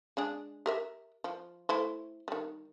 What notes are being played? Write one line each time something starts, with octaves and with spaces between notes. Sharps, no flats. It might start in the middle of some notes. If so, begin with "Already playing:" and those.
G#3 D4 G#4
G4 A#4 E5
F3
A3 E4 C5
D#3 G3